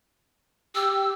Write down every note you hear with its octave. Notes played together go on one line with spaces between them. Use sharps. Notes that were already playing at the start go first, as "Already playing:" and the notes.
G4 E6